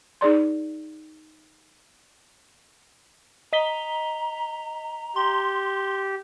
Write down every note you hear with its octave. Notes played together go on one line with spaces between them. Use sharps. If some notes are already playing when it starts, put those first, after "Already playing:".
D#4 G#4 D5 C6
D#5 A#5 B6 G7
G4 C6